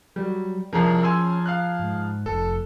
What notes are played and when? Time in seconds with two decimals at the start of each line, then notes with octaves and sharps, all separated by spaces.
0.16 F#3 G3
0.73 C2 F3 C#4 G#4 A#4 A#5
1.03 G#5 C6 E6
1.46 F5 F6 F#6
1.79 G#2
2.26 F1 A4